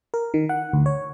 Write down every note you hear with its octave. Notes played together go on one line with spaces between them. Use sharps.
A#4
D#3
F#5
D2
C#5